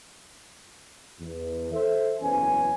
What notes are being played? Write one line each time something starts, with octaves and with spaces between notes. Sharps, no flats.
E2
A4 C5 E5
F#1 E2 C#4 B4 G#5